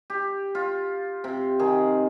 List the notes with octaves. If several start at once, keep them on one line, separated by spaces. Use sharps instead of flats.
G4
F4
C3
D#3 G#4